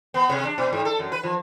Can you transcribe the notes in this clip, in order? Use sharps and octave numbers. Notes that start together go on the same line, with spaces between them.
B3
C3
D4
B2
G#2
A4
F#2
B4
F3